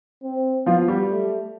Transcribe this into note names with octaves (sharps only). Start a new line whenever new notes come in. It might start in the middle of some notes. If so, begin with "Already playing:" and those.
C4
F3 B3 F4
G3 G4
A3